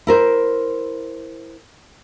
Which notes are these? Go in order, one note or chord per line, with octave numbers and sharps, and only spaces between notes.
E4 A#4 C5